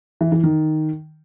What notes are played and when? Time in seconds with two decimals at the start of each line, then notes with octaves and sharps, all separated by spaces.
0.21 E3
0.32 E3
0.43 D#3